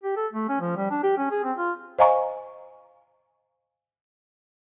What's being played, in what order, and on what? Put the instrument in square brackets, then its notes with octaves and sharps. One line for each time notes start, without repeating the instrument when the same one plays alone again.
[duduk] G4
A4
A3
C#4
F3
G3
D4
G4
C#4
G#4
C4
F4
[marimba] C5 D#5 F5 G#5 A#5 C#6